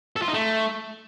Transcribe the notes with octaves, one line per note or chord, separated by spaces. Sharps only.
A4
F4
D#4
A3